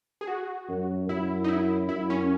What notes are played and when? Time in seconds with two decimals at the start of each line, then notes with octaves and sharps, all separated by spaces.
0.21 G#4
0.27 F#4
0.68 F#2
1.09 F#2 E4
1.44 D#4
1.48 E4
1.89 F#2 E4
2.10 C#4